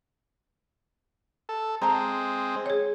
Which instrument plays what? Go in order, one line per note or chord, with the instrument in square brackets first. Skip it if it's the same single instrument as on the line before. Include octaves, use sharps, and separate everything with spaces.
[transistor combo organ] A4
[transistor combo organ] G#3 C4 [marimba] A5 A#5
[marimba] G#4 C#5